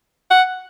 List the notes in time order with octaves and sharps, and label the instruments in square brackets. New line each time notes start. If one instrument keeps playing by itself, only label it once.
[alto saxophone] F#5